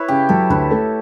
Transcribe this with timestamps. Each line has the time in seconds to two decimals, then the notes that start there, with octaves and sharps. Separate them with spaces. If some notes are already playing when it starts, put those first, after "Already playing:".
Already playing: E4 B4 C#5
0.08 C#3 G4
0.29 F#3 A4
0.50 D2 B4
0.71 A3